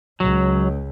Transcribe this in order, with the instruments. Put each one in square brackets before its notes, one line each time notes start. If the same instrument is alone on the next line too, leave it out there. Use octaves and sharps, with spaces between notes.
[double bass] C#2 [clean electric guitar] F#3